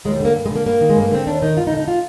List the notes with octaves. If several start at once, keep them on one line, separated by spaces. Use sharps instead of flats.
D#2 G#3
G3
D3 A#3
G2
G#3
D3 A#3
G2 A#3
D#3
G#3
G2
A#3
D3 C4
D#2 D4
D#3 D#4
G2 F4
D#4
D3
D#4
F4